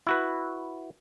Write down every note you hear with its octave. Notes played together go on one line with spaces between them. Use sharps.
E4 F#4 B4